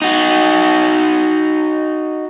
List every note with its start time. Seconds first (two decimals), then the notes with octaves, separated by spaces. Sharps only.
0.02 D#4 F#4